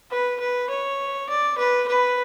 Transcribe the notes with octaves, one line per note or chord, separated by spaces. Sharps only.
B4
B4
C#5
D5
B4
B4